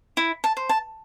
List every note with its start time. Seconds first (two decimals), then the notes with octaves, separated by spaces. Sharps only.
0.17 E4
0.44 A5
0.57 C5
0.69 A5